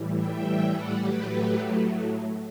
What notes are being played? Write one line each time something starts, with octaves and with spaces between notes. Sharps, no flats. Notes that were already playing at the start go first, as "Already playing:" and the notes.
Already playing: A2 E3 G3
E5 G5
D5 F#5
A2 F#3 A3 G4 B4
G4 B4